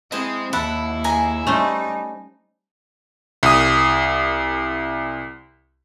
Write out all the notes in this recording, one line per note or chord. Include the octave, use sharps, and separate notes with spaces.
C4 E4 G#4 C5 D#5
D#2 E4 A4 F#5 B5
G#4 G#5 A#5
G3 A3 C#4 D#4 C5
C2 D#6